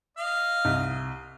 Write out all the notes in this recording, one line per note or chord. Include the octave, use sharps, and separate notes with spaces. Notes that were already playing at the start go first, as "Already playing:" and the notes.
D#5 F5
C2